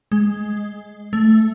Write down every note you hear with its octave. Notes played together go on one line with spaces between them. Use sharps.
G#3
A3